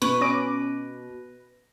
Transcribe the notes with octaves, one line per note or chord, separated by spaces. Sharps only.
B2 B4 C#6
C#4 D6 A#6 D7